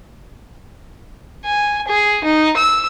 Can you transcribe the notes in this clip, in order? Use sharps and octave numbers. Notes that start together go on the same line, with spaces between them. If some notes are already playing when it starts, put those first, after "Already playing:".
G#5
G#4
D#4
E6